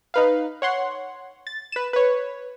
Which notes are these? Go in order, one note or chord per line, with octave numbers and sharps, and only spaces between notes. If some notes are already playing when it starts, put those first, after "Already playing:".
D#4 B4 F5
C#5 F#5 C6
A6
B4 E7
B4 C#5